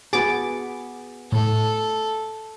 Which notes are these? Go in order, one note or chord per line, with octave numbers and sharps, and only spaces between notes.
B3 F#4 G#4 D6 A6
A2 A4